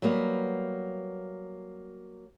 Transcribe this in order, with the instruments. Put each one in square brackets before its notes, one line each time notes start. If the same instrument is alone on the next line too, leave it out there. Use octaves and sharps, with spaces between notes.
[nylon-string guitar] F#3 G3 A#3 B3